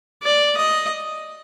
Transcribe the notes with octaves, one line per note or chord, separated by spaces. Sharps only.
D5
D#5